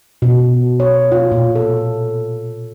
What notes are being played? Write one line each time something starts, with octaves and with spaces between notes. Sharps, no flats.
B2
C#5
F4
A#2
A4